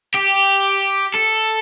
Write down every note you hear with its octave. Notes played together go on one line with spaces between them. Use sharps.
G4
A4